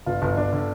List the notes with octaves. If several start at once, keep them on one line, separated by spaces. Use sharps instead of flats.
G1 F4
G1
G1 D4
D3